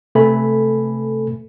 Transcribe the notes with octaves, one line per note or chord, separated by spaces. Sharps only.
C3 A3 A4 B4 G#5 B5